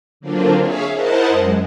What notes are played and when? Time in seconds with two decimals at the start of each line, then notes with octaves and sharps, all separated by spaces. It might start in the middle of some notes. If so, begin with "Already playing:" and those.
0.20 D3 F#3 A#3 C4 D4 F4
0.58 G#4 C#5 E5 F5
0.92 E4 A#4 C5 D#5 F#5 A5
1.28 F#2 G#3